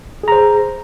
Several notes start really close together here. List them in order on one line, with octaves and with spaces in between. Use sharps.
G#4 A#5 C5